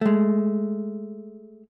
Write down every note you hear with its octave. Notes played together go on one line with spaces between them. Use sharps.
G#3 A3